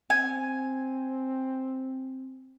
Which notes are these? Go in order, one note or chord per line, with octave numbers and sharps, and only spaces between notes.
C4 G#5